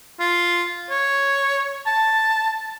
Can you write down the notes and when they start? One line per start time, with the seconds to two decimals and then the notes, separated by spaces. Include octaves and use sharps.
0.20 F4
0.90 C#5
1.86 A5